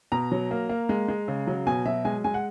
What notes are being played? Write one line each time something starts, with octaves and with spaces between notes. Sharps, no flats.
B2 A#5
F#3
A#3
A#3
G#3
G#3
C#3
F#3
B2 G#5
F#3 E5
G#3 G#5
G#3 G#5
F#5